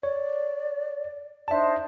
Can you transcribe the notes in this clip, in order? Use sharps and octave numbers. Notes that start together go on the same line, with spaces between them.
C#5 D5
D4 D#4 C5 D5 E5 A5